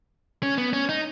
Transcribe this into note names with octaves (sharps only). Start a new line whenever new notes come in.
C#4
B3
C#4
D#4